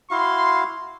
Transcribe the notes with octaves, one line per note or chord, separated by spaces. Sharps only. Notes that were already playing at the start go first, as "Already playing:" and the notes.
E4 F#4 F5 C6